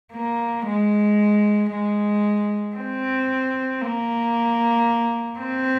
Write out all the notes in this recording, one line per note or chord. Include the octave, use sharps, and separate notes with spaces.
A#3
G#3
G#3
C4
A#3
C4